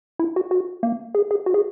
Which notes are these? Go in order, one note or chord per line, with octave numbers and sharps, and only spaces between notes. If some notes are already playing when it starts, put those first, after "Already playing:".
E4
F#4
F#4
A#3
G#4
G#4
F#4
G#4